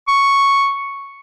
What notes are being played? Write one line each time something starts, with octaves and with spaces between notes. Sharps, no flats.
C#6